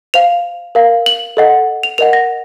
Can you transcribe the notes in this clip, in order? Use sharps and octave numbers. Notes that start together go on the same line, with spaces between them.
C5 F5 F7
A#4 F5
F#7
A4 D#5 F#5
F7
A#4 D#5 F#5 F7
A#6